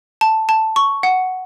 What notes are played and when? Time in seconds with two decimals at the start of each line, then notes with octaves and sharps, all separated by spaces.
0.21 A5
0.49 A5
0.76 C#6
1.03 F#5